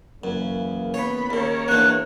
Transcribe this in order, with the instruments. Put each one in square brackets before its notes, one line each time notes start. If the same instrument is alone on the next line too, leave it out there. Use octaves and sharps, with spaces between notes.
[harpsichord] F#2 [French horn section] C#3 E3 A#3
[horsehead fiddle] B3 B5 [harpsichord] C#5
[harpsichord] D#2 C#3 [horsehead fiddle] A#4 C#5
[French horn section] E2 [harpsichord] A#3 D4 [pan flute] F#6